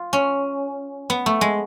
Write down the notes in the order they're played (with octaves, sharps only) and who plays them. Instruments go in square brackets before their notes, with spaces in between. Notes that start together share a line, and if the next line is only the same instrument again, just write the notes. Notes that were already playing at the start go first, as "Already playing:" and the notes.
Already playing: [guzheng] F4
C#4
B3
A3
G#3